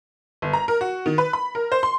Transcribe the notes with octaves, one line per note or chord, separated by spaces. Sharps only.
G1
A#5
A#4
F#4
D#3
B4
B5
A#4
C5
C6